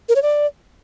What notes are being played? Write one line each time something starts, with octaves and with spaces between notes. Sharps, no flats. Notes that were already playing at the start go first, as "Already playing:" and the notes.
A#4
C#5
D5